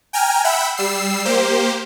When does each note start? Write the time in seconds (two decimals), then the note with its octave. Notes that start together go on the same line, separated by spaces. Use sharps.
0.13 G5 G#5 A#5 F6
0.44 E5 F#5 G5 B5 E6
0.77 G3 E6 C7
1.25 A#3 G4 C5